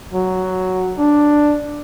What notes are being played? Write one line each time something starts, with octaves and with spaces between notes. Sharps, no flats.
F#3
D4